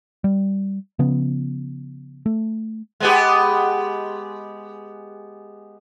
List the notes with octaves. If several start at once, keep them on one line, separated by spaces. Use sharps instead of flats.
G3
C#3 F3 B3
A3
G#3 B3 G4